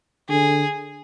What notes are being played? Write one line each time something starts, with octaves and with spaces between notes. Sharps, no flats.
D3 G#4